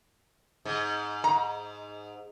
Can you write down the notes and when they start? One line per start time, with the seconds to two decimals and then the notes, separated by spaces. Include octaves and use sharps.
0.65 G#2
1.24 A#5